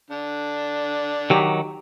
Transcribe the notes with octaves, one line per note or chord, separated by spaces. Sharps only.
D3 D4
D#3 F#3 G4